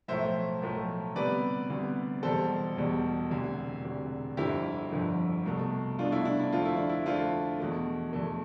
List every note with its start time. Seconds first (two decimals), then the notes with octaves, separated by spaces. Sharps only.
0.08 B1 A2 F3 A3 C5 E5
0.62 B1 A2 F3 A3
1.15 D2 C3 G3 B3 B4 D5
1.70 D2 C3 G3 B3
2.23 E1 E2 B2 G3 A4 C5
2.77 E1 E2 B2 G3
3.30 E1 D2 C3
3.84 E1 D2 C3
4.37 G1 F2 D3 F3 E4 G4
4.92 G1 F2 D3 F3
5.46 C2 B2 A3
5.99 C2 B2 A3 D4 F4
6.12 E4
6.25 D4
6.39 D4
6.52 F2 D3 F3 A3 F4
6.65 E4
6.76 D4
6.90 E4
7.06 F2 D3 F3 A3 D4 F4
7.59 E2 B2 A3
8.13 E2 B2 A3